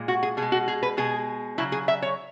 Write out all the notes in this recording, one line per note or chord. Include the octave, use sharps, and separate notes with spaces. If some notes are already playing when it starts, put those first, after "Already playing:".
Already playing: A#2 G#3
F#4
G#4
B2 G#4
G#3
F#4
G#4
B4
B2 G#3 G#4
C#3 F#3 E4
G#4
E5
C#5